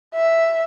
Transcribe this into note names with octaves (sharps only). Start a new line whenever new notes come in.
E5